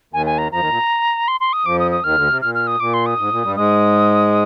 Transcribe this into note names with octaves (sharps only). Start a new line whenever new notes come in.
D#2 D#3 G#5
G#5
A#5
F2 F3 A#5
D#2 D#3
A#2
C6
C6
D#6
F2 F3 D6
D#6
D#6
D#2 D#3 F6
D2 D3
C3
A#2 F6
F6
D#6
A#2 D6
C6
D#6
G#2
A#2
G2 G3
G#2 G#3 D#6